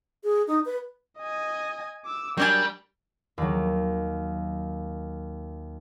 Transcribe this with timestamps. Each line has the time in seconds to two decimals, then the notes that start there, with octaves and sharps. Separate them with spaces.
0.24 G#4
0.47 D#4
0.66 B4
1.19 D#5 G#5
2.05 D6 E6
2.37 F#3 G3 D4 A#4 G#5
3.38 D#2 F#3